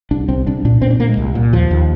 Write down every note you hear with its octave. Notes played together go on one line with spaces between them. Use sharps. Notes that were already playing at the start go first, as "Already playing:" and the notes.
C2 D4
C2 C4
C2 D4
A#2 D4
A#2 C4
D4
A#2 A#3
G#3
C2
A#2
D#2 F3
D#2